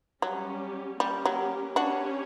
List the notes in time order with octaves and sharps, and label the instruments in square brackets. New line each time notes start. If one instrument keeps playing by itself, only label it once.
[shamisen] F#3 [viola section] G3 C#4 G4
[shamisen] G3 [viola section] A#3 C#4 G4 A#4
[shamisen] F#3
[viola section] C#4 G4 C#5 [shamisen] D4 F#4